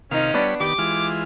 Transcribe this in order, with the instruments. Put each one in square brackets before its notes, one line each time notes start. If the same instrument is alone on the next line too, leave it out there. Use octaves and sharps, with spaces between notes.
[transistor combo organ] C3 F5 [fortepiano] D#3 D#4 [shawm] C#4
[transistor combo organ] G3 C#5 B5 [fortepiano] B3 D4 D5
[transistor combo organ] D#3 B3 [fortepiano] G4 [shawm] D6
[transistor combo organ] E3 G#3 F4